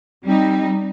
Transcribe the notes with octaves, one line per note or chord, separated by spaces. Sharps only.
G3 C4 D#4